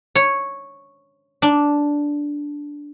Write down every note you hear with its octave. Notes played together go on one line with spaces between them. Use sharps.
C#5
D4